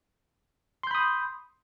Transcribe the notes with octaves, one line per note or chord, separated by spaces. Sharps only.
B5 C6 D#6 G6